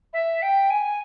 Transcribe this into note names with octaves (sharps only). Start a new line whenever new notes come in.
E5
G5
G#5